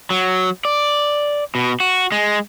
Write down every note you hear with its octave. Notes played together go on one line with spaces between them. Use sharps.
F#3
D5
B2
F#4
G#3